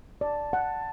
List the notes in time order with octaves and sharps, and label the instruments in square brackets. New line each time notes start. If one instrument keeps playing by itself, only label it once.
[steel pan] D5 [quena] A5
[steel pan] F#5